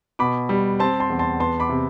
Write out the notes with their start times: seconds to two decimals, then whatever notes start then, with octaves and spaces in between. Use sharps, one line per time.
0.19 B2 B5 D6
0.49 G3
0.79 C4 A5 C6
1.00 A5 C6
1.10 E2
1.19 A5 C6
1.40 B3 A5 C6
1.60 B5 D6
1.69 C3